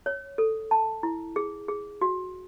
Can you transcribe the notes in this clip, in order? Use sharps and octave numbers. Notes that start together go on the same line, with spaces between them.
C#5
A4
A5
E4
G#4
G#4
F#4